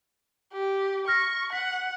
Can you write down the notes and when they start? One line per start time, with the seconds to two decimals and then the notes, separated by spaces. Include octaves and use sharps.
0.53 G4
1.08 C#6 F6 A#6
1.53 F#5 B6